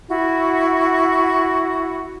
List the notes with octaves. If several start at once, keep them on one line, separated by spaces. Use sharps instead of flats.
E4 F#4